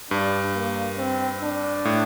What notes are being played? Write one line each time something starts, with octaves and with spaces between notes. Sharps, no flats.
G2 D4
A#3
C4
D4
A2